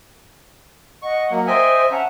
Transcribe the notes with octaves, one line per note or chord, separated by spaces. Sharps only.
D#5 F#5 C#6
F#3 A#3
C5 D#5 E5 G5 G#5
C#4 E5 F#5 A5 A#5